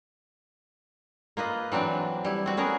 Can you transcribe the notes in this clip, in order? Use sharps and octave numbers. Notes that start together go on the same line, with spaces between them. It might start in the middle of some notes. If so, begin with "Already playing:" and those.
A#3 F4 B4 D#5
E3 F#3 C4 D4 D5
G3 E4
C4 F#4
B3 C#4 G#4 A#4